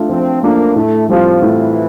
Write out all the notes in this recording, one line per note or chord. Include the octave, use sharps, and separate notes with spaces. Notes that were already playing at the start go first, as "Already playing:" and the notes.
Already playing: A3 D4 F4
F3 C4
A3 A#3 D4 F4
A2 A3
F3 G3 C4 F4
A2 E3